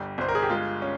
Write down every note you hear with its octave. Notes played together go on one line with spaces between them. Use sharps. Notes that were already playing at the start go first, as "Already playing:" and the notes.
Already playing: G1 G3 G4
G1 C5
A#4
G#4
G4
G#3 F4
C#4